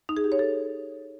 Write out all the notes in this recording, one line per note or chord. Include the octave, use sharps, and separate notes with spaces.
D#4
G#4
G4
C#5
A4